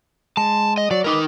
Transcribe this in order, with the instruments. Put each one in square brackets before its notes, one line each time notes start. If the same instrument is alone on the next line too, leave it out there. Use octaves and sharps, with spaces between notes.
[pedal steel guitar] G#3 [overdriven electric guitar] A5
[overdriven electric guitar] D#5
[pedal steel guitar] F#3 [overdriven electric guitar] D5
[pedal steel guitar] G#3 B4 D6 [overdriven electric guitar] D#4 A#4